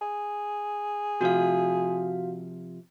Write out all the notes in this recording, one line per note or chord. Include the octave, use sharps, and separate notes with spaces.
G#4
C3 F3 F#4 F5